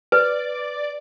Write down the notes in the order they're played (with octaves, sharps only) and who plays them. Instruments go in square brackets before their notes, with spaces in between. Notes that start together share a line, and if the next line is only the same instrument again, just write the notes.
[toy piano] B4 [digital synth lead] D5